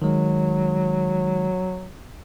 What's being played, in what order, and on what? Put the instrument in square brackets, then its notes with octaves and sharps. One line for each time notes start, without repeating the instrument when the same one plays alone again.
[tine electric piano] D#3 G#3 [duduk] F#3